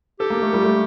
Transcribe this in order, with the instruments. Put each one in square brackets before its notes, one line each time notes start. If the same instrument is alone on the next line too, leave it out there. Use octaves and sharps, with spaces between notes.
[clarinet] G4 [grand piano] A4
[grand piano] A#3
A3
G3
A3